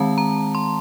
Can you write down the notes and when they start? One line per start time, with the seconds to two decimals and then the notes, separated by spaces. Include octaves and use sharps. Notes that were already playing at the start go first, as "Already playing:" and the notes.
Already playing: D#3 G#3 C4 A5
0.18 A#5
0.55 C6